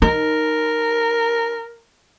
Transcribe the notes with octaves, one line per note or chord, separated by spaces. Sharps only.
D#4 A#4